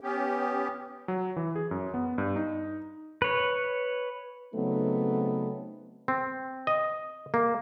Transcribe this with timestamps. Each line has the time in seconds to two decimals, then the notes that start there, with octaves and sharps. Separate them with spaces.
0.01 B3 C#4 G4
1.08 F#3
1.36 E3
1.56 G#4
1.71 F#2
1.94 B3
2.18 G2
2.36 D#4
3.22 B4 C#5
4.54 C#3 F#3 A3 B3 C4 D#4
6.08 C4
6.67 D#5
7.34 A#3